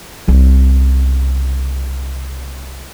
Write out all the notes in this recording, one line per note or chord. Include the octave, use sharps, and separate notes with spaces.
C2 C#3